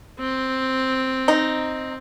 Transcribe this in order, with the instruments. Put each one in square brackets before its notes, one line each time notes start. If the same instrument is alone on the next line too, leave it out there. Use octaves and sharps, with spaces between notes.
[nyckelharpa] C4
[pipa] D#4